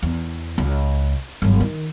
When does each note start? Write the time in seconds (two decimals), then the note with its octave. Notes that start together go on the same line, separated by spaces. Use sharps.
0.02 E2
0.58 C#2
1.42 G1 F#3
1.60 D#3